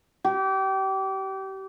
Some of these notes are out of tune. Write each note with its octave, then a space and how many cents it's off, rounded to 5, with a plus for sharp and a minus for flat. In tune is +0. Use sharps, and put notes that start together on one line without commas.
G4 -30